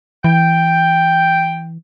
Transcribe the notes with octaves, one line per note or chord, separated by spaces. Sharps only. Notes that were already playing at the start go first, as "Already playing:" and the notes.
E3 G5